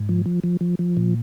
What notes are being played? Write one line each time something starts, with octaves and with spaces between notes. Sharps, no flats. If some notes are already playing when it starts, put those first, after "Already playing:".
Already playing: G#2
F3
F3
F3
F3
F3
A#2